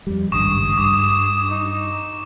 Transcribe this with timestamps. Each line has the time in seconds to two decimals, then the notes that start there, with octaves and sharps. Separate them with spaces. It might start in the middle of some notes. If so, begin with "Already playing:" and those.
0.07 F2 G3
0.32 G#1 C#2 G2 C#6 D#6 E7
0.78 G2 D6
1.51 D#4